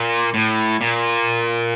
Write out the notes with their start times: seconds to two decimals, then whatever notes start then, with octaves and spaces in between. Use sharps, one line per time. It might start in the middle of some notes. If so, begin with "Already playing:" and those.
Already playing: A#2
0.34 A2
0.81 A#2